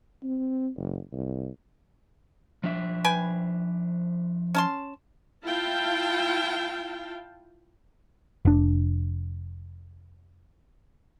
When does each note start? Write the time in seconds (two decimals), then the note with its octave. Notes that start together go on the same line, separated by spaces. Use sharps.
0.23 C4
0.77 F#1
1.13 C2
2.64 F3 D4 E5
3.04 B4 G5 G#5
4.55 C#4 A5 C6
5.45 E4 F4 F5 G5 A5
8.45 F1 D4